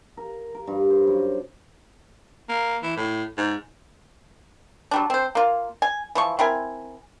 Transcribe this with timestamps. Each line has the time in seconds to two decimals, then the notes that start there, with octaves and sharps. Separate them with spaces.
0.17 A#4
0.55 A#4
0.67 G2
0.90 C5
1.07 F#2
2.49 A#3
2.83 E3
2.97 A2
3.38 G#2
4.91 F#3 G3 D4
5.10 C4 C5
5.35 A#3 F4
5.82 G#5
6.15 E3 F3 C#6
6.39 C4 E4 A#4 G#5